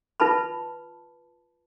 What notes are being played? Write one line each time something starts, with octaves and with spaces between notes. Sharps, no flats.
F4 B4 A5 B5